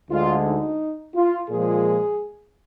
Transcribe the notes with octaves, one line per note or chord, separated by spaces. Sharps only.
D2 D3 G#3 F4
D#4
F4
A#2 F3 G#3 G#4